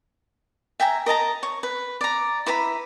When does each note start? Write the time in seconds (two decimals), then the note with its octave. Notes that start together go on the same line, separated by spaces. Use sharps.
0.80 E5 G5 G#5 A#5
1.06 A#4 D#5 A5 A#5
1.43 C#5
1.63 B4
2.01 D5 A#5
2.46 E4 B4 A#5 B5